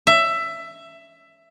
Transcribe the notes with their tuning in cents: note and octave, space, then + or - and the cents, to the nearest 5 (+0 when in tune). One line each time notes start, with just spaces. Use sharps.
E5 +15